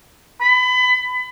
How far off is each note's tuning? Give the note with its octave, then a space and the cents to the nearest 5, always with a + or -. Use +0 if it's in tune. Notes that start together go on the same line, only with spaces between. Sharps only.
B5 +25